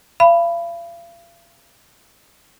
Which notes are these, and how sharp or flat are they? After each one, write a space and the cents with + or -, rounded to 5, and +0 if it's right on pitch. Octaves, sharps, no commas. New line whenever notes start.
F5 -40 B5 +0